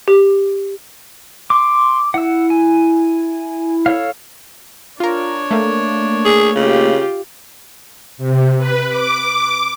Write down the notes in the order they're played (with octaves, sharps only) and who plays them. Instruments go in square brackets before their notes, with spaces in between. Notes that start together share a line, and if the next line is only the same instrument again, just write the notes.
[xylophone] G4
[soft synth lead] C6 [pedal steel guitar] D6
[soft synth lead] E4 [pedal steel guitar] F#5 E6
[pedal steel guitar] G#5
A4 C#5 F5
[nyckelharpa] D4 C#5 [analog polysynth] F4 A#4
[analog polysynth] A3 A#3
[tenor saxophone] G#4
[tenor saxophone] C#3 [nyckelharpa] F4 G4
[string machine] C3
B4
D6